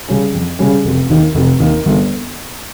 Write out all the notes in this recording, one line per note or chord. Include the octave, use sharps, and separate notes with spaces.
C#3 G3 C#4
F2
C#3 G3 C#4
F1
D#2 D#3
F1
D#2 D#3
G1